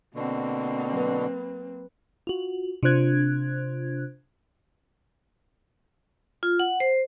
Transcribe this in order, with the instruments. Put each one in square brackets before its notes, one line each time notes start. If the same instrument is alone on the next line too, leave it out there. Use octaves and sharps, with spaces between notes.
[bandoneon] B2 D3 [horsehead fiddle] A#3 C4
[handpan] F#3 B4
[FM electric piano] F4 F#4
C3 D4 F4 C5 F#6 G#6
[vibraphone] F4
F#5
C5